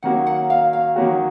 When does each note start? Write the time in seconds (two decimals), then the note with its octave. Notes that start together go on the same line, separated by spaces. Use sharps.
0.03 D#3 F#3 A#3 C#4 F#4 F#5
0.27 F#5
0.50 F5
0.73 F5
0.96 D#3 F#3 A#3 C#4 F#4